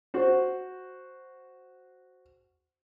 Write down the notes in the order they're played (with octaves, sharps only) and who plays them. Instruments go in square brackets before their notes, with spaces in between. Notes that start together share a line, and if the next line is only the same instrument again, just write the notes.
[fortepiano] F#4 C5